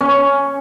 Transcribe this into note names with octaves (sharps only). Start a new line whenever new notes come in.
C#4